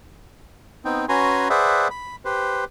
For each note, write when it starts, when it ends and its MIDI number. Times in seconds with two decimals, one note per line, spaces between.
0.85 1.05 59
0.85 1.05 60
0.85 1.05 63
0.85 1.05 79
1.09 1.48 61
1.09 1.48 66
1.09 1.48 71
1.09 1.48 80
1.09 1.48 82
1.09 1.48 84
1.50 1.88 68
1.50 1.88 71
1.50 1.88 72
1.50 1.88 74
1.50 1.88 76
1.50 1.88 78
1.91 2.16 83
2.25 2.65 67
2.25 2.65 71
2.25 2.65 72